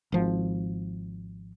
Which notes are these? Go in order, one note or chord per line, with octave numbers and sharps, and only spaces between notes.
G#1 F3